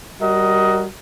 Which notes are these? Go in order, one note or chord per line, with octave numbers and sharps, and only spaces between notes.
G3 F#4 A#4 D#5